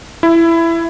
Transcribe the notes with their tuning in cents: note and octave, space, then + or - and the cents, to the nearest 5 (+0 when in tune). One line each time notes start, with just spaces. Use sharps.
E4 +15